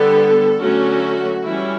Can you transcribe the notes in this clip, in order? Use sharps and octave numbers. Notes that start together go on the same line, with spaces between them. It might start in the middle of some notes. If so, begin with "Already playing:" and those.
Already playing: D3 G3 B3 A4
D3 F#3 A3 C#4 F#4
E3 G3 C#4 E4